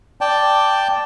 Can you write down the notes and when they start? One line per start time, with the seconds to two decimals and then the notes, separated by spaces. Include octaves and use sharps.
0.21 D5 G5 A5